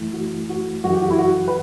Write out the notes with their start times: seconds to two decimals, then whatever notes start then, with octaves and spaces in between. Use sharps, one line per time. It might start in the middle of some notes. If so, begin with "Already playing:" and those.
Already playing: F#2 E3 A3 E4
0.13 F#4
0.49 F#4
0.84 F#2 C#3 E3 F#4
0.93 G4
1.02 F#4
1.10 E4
1.19 F#4
1.48 B4